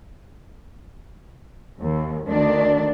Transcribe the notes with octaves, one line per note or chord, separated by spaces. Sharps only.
D#2
D2 D#3 D4